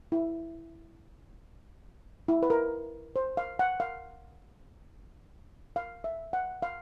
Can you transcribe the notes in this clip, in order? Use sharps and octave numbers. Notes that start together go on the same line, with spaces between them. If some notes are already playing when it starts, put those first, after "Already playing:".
E4
E4
B4
A#4
C5
F5
F#5
F5
F5
E5
F#5
F5